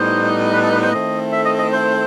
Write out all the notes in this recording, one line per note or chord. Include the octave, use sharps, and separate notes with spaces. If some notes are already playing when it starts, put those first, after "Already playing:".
Already playing: A2 G3 B3 D#4 C5
B4
A4
B4
C5
D#3 A3 C4 E4 A4 D#5
E5
D#5
D#5
C5